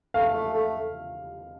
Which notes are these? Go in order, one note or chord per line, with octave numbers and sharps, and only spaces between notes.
A3 F5
A3
A3